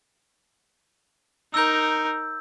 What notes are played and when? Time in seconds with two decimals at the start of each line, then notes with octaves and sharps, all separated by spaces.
1.54 D#4 A#4 E6 G6